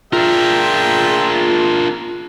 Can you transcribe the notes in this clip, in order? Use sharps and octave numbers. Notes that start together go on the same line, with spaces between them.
D4 F4 G#4 A#4 E5 G5